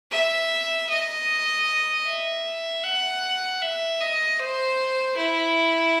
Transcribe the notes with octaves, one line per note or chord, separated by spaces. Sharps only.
E5
D#5
E5
F#5
E5
D#5
C5
E4